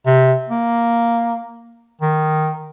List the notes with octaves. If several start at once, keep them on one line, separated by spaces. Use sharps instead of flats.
C3
A#3
D#3